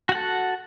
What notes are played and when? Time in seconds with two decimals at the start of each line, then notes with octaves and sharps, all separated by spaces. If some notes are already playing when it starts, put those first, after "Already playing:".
0.09 F#4
0.12 F#5
0.15 A4